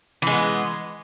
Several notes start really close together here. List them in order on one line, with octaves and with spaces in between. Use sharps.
E3 G#3 B3